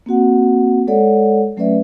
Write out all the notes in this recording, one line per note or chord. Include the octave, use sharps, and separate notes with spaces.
A#3 C4 F#4 F#5
G#3 A4 C#5 D5 F#5
F#3 A3 C#4 B4 D5 E5